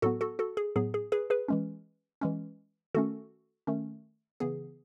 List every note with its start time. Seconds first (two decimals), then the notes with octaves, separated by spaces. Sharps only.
0.02 A2 F#3 B3 F#4 A4
0.21 F#4 A4
0.39 F#4 A4
0.57 G#4
0.76 A2 F#3 B3 G#4
0.94 G#4
1.12 G#4 B4
1.30 G#4 B4
1.48 E3 G#3 C#4
2.21 E3 G#3 C#4
2.95 D#3 A3 C#4 F#4 A4
3.67 D#3 A3 C#4
4.40 C#3 E3 B3 G#4